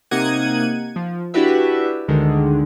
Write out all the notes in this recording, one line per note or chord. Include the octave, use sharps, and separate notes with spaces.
C3 A#3 D#4 F#5 G#6 D#7
F3
D4 E4 F#4 G4 B4 E5
D2 D3 D#3 G#3